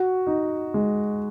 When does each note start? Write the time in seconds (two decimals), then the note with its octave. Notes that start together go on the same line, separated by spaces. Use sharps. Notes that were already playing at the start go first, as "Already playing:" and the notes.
Already playing: F#4
0.27 D#4
0.74 G#3